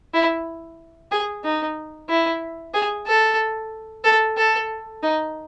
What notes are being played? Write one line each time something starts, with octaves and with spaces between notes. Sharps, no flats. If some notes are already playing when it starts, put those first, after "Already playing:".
E4
G#4
D#4
E4
G#4
A4
A4
A4
D#4